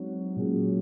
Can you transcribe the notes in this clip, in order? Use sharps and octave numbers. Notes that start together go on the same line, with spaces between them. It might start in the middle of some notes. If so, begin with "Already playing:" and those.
Already playing: F#3 G#3 C4 D#4
A#2 G#3 C#4 G#4